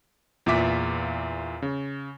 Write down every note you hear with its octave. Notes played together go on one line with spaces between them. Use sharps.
E2 A#2 F4 E5 D6 B6
C#3